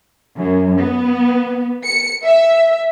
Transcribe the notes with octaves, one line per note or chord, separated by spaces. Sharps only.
F#2
B3
C#7
E5